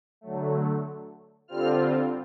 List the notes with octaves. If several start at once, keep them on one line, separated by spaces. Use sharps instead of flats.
D3 F#3 A3
D3 G3 C4 F4 F6